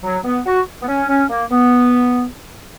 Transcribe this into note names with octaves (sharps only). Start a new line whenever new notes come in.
F#3
B3
F#4
B3
C#4
C#4
A#3
B3